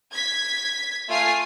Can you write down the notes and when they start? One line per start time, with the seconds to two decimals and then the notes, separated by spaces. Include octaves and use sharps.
0.10 G#6 B6
1.08 A3 F4 G#5 F6 C7